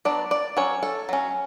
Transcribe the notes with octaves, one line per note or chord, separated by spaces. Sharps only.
F#3 B3 D4 D5
D5
F#3 C#4 C#5
A4
F#3 C#4